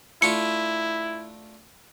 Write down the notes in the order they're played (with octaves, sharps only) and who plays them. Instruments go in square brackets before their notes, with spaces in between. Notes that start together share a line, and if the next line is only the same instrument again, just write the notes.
[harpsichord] A3 D4 F4 [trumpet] E4 [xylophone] C#7